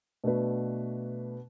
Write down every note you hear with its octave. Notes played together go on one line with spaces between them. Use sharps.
B2 A3 D4 F#4 B4